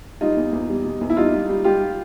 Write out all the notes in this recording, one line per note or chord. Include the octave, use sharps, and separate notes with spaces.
G3 D#4 F4
E2
E2
G3
B2
E2
E4
G3 D#4 F4
G3
G3
G3 F4 G4